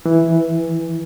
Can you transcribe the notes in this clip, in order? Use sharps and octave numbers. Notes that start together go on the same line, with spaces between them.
E3